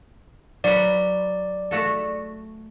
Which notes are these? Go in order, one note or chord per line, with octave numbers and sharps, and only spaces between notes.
F#3 B4 D5
A3 F#4 A4